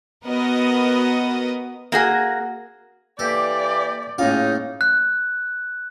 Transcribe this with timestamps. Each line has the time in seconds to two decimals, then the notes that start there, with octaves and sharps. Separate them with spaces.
0.23 B3 F#4 A#4 B4 D#5 F#5
1.92 A#3 F#4 G#4
3.19 E3 A#3 G4 A4 D5
4.19 A2 C#3 A#3 C#4 D#4 F4
4.81 F#6